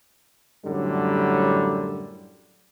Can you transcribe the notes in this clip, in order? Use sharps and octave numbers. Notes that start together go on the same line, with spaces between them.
F#2 A2 D3 F#3 G3